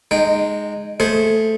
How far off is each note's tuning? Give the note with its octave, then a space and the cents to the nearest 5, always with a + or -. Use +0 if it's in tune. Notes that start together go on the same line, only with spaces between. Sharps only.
G#3 +0 D#4 -20 G5 +0
A3 +0 G#4 +10 C5 +0